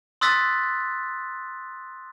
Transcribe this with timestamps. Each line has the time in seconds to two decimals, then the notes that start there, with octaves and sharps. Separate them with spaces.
0.21 C6 D#6 E6 F#6 A6 B6